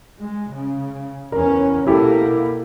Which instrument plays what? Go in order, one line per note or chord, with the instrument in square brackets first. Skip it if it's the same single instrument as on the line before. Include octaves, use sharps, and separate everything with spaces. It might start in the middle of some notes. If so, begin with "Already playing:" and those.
[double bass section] G#3
C#3
[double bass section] E2 C#4 [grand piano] A#4
[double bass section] B2 A#3 [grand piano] E4 G4 A4